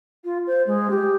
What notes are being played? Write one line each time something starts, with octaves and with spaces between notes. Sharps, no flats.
F4
C5
G#3
G4